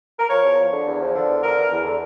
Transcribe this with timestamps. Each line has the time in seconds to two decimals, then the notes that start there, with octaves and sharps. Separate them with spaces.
0.19 A#4
0.30 F3 C#5
0.43 E2
0.58 F3
0.72 D3
0.86 E2
1.01 F3
1.15 D3
1.29 E2
1.43 D3 A#4
1.57 E2
1.72 E2
1.85 D3